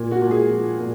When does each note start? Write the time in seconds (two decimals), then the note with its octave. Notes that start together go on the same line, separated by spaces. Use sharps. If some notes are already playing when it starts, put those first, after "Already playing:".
Already playing: A#2
0.11 F#4
0.22 A#2
0.31 G#4
0.50 F3
0.79 A#2